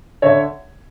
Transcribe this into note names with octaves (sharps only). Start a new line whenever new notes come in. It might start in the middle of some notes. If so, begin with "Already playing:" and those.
D3 C#5 E5